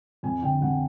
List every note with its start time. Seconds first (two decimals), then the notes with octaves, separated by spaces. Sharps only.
0.23 F2 G#5
0.42 D3 G5
0.61 F2 F#5